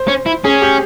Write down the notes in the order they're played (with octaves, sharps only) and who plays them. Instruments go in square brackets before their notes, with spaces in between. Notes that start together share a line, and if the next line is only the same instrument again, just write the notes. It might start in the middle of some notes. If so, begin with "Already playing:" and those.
Already playing: [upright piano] C5
[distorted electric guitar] C#4
E4
[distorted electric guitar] C#4 [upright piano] G#4
[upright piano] G4